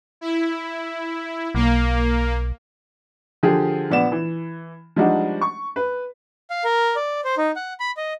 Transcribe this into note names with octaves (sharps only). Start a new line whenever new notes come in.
E4
B1 A#3
D3 F3 G4 G#4
A#1 B3 D5 E7
E3
F3 G3 G#3 D4 D#4 F#4
C#6
B4
F5
A#4
D5
C5
D#4
F#5
B5
D#5